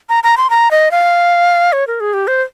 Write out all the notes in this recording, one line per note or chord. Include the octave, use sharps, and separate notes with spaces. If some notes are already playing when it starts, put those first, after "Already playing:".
A#5
A#5
C6
A#5
D#5
F5
C#5
A#4
G#4
G4
C5